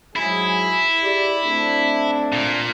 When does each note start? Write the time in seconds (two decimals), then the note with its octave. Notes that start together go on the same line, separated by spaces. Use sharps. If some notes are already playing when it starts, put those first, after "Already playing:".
0.16 G#2 F#3 E4 G#4
1.03 G4 G#4 D5
1.43 A3 C4 D4
2.32 A#2